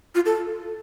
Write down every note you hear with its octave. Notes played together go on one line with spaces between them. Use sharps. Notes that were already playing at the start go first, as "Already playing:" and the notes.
F4
A4